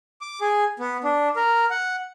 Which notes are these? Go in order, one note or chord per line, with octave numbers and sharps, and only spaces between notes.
D6
G#4
B3
D4
A#4
F#5